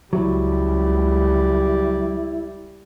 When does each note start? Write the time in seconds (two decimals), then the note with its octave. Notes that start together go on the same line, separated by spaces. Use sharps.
0.13 C#2 F#3 G3 E4